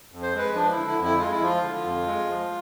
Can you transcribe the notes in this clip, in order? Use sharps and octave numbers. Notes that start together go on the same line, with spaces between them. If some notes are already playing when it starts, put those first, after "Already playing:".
F2
C5
G#3 B4
F3 D4
D3 E4
E4
F2
E4
G#3 F4
E4
F3 F4
D3
F2
G#3
F3